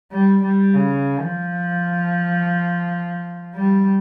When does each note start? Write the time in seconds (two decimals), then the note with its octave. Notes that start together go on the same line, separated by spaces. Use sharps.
0.12 G3
0.43 G3
0.74 C#3
1.21 F3
3.55 G3